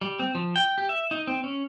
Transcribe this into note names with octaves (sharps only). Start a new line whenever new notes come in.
G3
C4
F3
G5
G4
E5
D#4
C4
C#4